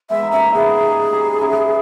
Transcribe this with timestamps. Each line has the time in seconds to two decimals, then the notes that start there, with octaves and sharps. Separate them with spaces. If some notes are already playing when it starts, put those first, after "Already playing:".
0.10 G#3 B3 E5
0.22 D#4
0.32 A#3 C#4 E5
0.47 E4
0.54 B3 D#4 G#4
0.83 D#4 G4
1.12 D#4 G4
1.34 D#4
1.41 C#4 E4